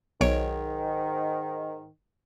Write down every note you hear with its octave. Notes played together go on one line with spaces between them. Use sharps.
B1 G#2 D#3 C#5 D7